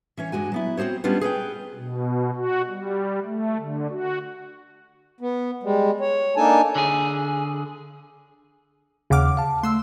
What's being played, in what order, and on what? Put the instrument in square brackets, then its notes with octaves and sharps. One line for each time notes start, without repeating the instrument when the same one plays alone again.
[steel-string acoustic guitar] E3 C#4 C#5
G2 G#3 F#4 G#5
F#3 B3 E4
C4 F#4 G#4 C5 C#5
G3 G#3 B3 C#4 D4 F4
G#4 B4 C#5 G5
[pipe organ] B2
F#4
G3
A3
D3
F#4
[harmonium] B3
G3 G#3
C#5
A#3 D4 D#4 A4 G#5 A5
[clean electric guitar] D3 G#4
[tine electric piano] D#2 F#5 F6 [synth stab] C#3 D6
[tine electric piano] F5 A5
[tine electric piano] A3 [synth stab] C6 E6